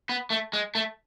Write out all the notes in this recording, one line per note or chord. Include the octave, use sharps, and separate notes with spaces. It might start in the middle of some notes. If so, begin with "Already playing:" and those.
B3
A3
G#3
A3